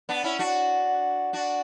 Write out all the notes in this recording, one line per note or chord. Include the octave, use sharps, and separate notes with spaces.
B3 D4
C#4 E4
D4 F#4
D4 F#4